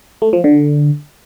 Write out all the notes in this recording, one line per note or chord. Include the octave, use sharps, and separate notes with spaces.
A3
F3
D3